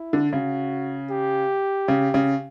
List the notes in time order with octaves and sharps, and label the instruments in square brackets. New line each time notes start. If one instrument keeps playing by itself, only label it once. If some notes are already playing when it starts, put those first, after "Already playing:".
Already playing: [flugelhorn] E4
[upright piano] D3
[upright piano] C#3 [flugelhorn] F#4
[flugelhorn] G4
[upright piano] C#3
C#3